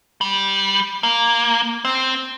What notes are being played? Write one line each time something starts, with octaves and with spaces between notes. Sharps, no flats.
G3
A#3
C4